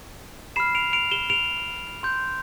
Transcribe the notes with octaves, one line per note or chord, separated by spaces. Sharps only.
B5 F6 C7 E7
D7 F7
D7 F7
E7 G7
D7 F7
C6 G6